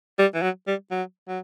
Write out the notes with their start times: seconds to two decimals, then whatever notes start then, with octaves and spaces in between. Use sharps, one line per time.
0.19 G3
0.34 E3
0.42 F#3
0.67 G3
0.91 F#3
1.28 F#3